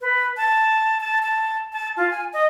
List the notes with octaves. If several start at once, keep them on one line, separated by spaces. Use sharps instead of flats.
B4
A5
A5
A5
A5
F4
G#5
D#5